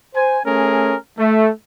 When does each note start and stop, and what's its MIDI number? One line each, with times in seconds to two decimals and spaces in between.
0.14 0.39 72
0.14 0.39 80
0.45 0.94 57
0.45 0.94 61
0.45 0.94 68
0.45 0.94 70
1.17 1.49 57